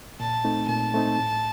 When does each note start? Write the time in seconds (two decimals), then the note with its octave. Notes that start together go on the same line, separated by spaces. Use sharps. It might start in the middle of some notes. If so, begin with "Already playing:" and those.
0.20 A#2 A5
0.45 A3 C4 D#4
0.69 A#2 A5
0.94 A3 C4 D#4
1.19 A2